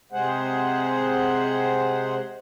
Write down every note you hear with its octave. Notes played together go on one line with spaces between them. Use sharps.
C3 G#3 G#4 C5 F#5